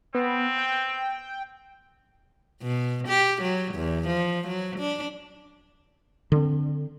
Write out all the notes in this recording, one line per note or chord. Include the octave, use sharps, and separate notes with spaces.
B3 C4
G5
B2
G4
F#3
E2
F3
F#3
D4
D3 C4